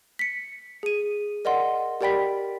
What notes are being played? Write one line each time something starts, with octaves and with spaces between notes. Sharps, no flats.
B6 C#7
G#4 D#7
A#4 D5 D#5 F#5 C6
G4 A#4 D5 G5 B5 B6